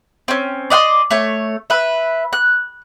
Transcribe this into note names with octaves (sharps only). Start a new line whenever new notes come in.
C4 C#4
D5 D#5 F#5 C6
A3 C#5
B4 E5
F#6